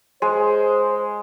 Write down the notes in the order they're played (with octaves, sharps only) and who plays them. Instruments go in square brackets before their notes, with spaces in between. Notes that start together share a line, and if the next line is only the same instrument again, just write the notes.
[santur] G#3 [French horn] C5